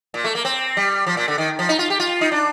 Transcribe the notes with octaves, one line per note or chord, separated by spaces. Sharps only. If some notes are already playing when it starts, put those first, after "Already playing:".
A#2
A3
A#3
C4
G3
F3
A#2
D3
D#3
F3
D#4
F4
G4
F4
D#4
D4